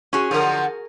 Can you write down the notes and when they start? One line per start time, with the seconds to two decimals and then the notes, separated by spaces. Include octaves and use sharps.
0.13 C#4 F#4 G#4
0.31 D3 F3 F#3 G#4 A#4